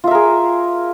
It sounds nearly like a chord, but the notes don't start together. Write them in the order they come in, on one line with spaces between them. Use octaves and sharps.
F4 E5 A#4 G#4